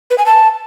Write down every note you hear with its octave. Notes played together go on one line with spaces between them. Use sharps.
B4
G#5
A5